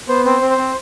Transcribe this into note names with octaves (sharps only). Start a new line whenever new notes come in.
B3 C5
C4 C5
C4
C5
C4